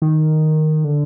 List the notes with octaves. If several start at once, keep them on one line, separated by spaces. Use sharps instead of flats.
D#3
D3